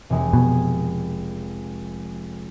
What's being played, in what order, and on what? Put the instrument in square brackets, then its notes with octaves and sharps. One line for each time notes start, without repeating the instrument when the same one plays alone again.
[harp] F1 G#3 G#5
[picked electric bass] B2